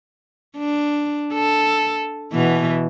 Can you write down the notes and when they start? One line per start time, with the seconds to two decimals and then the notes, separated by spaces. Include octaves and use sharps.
0.58 D4
1.34 A4
2.33 B2 E3